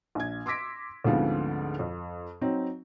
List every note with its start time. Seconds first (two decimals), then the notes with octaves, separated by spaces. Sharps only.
0.15 A#1 G#6
0.46 C6 D6 E6 A#6 B6 D7
1.04 D2 G#2 F3 B3 C4
1.79 F2
2.41 F#3 C4 D#4